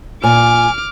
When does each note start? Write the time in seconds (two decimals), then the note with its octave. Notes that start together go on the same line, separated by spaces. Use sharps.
0.24 A#2 G#5 D6 F6